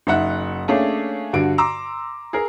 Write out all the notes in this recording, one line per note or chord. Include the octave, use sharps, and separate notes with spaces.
F#1 D#4 E5 F#5 F#6
A3 A#3 C#4 D4 G#4
G2 D3 F#4 D7
A#5 C6 D6 E6
G#4 A#4